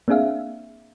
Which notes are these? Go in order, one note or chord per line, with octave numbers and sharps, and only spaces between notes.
A#3 C4 D4 G#4 E5 F5